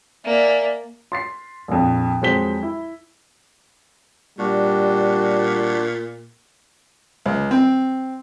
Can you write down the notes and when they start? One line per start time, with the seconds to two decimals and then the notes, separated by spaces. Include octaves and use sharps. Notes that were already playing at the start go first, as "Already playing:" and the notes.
0.25 A#3 D5 E5 G#5
1.12 C6 A6 C7
1.68 A#1 F2
2.22 F2 F#3 G#3 C5 B6 G7
2.63 E4
4.39 A#2 G3 D4 F#4
7.26 C#2
7.51 C4